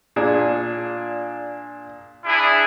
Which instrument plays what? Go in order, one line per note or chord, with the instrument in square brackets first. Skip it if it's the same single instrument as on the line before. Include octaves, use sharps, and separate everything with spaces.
[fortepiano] A#2 D4 G#4
[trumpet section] D4 E4 G#4